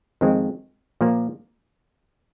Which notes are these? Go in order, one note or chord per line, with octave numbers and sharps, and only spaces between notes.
F2 D#3 G#3 C4
A#2 F3 A#3